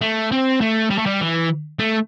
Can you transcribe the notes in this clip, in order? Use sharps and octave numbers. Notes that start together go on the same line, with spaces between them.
A3
C4
A3
G3
A3
G3
E3
A3